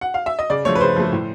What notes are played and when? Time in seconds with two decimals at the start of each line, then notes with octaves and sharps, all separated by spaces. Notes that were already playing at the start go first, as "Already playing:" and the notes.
0.01 F#5
0.14 F5
0.26 E5
0.39 D#5
0.50 C#3 D5
0.65 F3 A3 C#5
0.75 B4
0.81 C#3 C5
0.96 F3 A3
1.13 A2